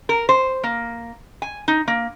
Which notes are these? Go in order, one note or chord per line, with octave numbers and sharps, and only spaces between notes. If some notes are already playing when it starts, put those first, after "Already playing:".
A#4
C5
A#3
G#5
D#4
A#3